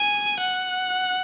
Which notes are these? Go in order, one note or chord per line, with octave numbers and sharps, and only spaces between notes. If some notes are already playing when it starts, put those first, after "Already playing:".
Already playing: G#5
F#5